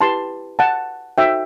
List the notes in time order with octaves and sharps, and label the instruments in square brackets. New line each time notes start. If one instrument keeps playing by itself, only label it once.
[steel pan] E4 G4 B4 A5 C6
F#5 A5
D#4 F#4 A4 C5 E5 G5